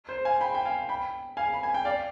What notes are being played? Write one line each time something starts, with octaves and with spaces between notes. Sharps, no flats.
C5
F5 G#5
G5 B5
G5
F5 G#5
G5 B5
F5 G#5
B5
G#5
G5
D5 F5